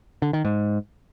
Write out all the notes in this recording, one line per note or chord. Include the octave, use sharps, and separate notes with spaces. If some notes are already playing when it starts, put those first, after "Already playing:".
D3
D#3
G#2